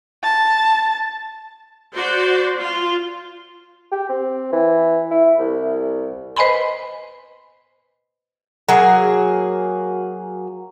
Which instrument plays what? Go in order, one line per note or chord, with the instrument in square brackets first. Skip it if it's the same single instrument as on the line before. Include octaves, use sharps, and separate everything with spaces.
[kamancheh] A5
[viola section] F#4 C5 D5
F4
[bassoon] G4
C4
E3
E4
C2
[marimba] B4 C5 D#5 G#5 B5 C6
[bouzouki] F#3 A#3 G#4